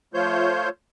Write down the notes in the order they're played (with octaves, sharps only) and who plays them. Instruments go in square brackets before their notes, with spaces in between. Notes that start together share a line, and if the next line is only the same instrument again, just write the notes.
[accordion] F3 A3 F4 C5 C#5 G6